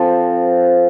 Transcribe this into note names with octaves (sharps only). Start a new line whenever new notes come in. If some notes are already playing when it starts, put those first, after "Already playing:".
Already playing: F3 C4 A4